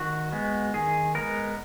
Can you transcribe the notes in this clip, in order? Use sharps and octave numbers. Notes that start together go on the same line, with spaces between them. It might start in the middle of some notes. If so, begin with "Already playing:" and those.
Already playing: D#3 F#4
G#3 B3
D#3 G#4
G#3 B3 A#4